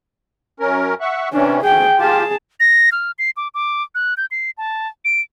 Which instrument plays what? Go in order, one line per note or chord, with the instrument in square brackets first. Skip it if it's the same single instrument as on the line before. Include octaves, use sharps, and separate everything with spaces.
[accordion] F#2 C#4 A#4
E5 F#5 C#6
[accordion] C3 E3 C#4 [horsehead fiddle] D4
[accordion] D2 [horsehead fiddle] G#4 G5
[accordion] F4 G4 [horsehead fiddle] G#4 A5
[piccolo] A#6
F6
C7
D6
D6
F#6
G6
C7
A5
D7